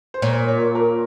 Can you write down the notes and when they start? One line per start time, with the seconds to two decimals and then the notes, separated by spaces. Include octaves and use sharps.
0.14 C5
0.22 A#2 C#5
0.48 C#5
0.75 A#4